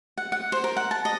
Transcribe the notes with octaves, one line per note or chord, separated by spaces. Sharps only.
F#5
F#5
C5
A#4
F#5
A5
D#5